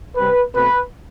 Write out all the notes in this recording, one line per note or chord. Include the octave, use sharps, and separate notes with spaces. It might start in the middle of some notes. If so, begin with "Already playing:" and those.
C3 G3 C4 B4
B2 A3 C4 B4